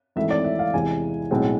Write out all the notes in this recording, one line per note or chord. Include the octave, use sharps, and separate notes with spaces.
G#1 G#2 E3 A3 C4 E5
D5
E5
F5
E2 C3 E3 G#3 C4 G#5
B1 A2 G#3 C4